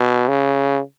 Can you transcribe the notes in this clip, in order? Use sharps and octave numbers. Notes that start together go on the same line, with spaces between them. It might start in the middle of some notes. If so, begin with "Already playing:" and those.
Already playing: B2
C#3